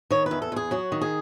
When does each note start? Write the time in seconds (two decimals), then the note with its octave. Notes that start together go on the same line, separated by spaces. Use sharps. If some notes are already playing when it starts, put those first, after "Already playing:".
0.10 D#3 C#5
0.26 B4
0.31 E2
0.42 A4
0.52 E2 G#4
0.71 F#3 F#4
0.92 D#3
1.01 G#4